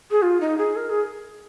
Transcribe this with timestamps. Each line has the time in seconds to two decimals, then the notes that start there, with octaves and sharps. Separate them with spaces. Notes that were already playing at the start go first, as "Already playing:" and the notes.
0.11 G#4
0.22 F4
0.40 D#4
0.58 G#4
0.76 A#4
0.90 G#4